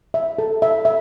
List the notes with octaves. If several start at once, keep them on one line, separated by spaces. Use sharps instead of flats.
E5
A4
E5
E5